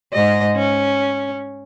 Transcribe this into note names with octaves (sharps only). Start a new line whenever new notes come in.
G#2 D#5
C#4